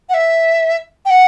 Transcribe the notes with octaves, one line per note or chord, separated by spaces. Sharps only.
F#5
E5
G5
F#5